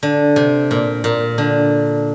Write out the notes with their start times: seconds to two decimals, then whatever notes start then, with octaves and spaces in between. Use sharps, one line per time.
0.03 D3
0.36 C3
0.71 A#2
1.04 A#2
1.38 D3